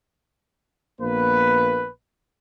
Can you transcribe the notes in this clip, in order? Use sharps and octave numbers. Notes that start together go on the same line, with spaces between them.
A#1 A#3 B3 B4